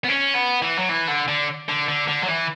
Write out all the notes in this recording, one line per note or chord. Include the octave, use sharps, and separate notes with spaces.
B3
C#4
B3
E3
F#3
E3
D3
D3
D3
D3
D3
F#3
E3